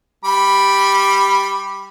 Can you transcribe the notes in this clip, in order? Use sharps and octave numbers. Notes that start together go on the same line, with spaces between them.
G3 B5 D6